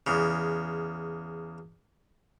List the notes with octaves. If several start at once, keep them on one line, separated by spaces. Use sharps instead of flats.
E2 C#3